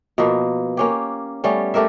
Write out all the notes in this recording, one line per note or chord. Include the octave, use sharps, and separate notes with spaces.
B2 F3 A#3
A#3 C#4 G4
G3 A3 B3 C#4
A3 G4 A#4 E5